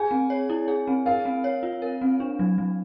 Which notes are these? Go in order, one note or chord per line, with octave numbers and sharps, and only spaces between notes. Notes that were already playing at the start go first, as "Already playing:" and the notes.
Already playing: G#4 G#5
C4
C#5
E4
G#4
C4
A#4 F5
C4
C#5
F4
A#4
C4
D4
F#3
F#3